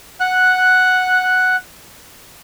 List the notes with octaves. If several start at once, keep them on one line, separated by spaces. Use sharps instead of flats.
F#5 F#6